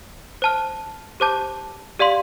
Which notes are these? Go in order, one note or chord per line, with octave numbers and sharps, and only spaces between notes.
C5 A5 F6
G4 C5 A5 D6 G6
G4 D5 F5 C6